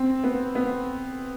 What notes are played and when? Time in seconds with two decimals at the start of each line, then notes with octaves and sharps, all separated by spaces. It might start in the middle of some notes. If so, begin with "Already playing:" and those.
Already playing: C4
0.24 B3
0.55 B3